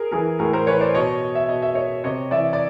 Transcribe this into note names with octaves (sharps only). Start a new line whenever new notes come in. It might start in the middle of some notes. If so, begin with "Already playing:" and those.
Already playing: G#4 A#4
E3 G#4 A#4
A2 G#4 A#4
A#4 C5
E3 B4 C#5
C5 D5
B2 C#5 D#5
D#5
E5
B2 D#5
E5
C#5 D#5
C3 C#5 D#5
E3 D5 E5
D5